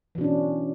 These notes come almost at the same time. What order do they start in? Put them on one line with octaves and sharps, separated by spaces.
E3 B2 D4 C#4